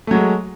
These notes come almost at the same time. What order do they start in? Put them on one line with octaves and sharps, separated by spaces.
A3 F#3 G#3